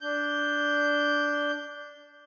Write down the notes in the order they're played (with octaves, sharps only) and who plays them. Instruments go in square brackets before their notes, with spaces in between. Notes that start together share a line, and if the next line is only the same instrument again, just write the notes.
[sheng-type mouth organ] D4 G6